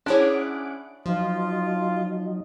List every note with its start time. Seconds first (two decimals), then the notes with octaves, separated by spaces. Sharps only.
0.06 C#4 D4 E4 G#4 C#5 F#5 D6
1.06 F3 F#3 D#4 F4